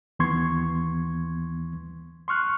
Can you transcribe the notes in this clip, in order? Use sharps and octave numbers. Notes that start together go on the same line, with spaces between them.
D#2 E3 B3 C6 C#6 G#6
C6 C#6 F6 F#6